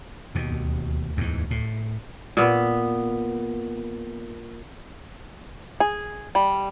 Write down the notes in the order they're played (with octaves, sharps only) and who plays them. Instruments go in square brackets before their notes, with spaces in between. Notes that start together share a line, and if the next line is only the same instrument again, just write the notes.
[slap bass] D#2 B2
[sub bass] D2
[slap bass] E2 G#2
A2
[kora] A#2 B3
[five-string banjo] G#4
G3